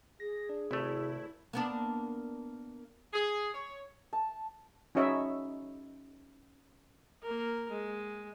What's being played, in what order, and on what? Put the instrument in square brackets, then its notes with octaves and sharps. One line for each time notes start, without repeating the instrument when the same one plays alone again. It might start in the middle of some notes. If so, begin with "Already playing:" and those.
[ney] G#4 [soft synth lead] A#6
[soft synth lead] D4
[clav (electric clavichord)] G#1 A3 [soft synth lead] C3 [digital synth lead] E4
[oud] A#3 B3 D4
[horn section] G#4
C#5
[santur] A5
[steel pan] C#4 D#4 F#4 C#5 D#5 E5
[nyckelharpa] A#3 A#4
G#3